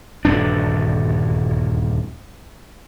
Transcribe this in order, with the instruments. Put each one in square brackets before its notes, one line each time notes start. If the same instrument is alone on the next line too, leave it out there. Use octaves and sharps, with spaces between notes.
[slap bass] D#1 D2 G2 D4